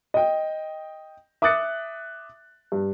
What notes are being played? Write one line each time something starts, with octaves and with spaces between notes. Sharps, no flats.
D#5 G5
E5 D6 D#6 F#6 A6 C#7
G2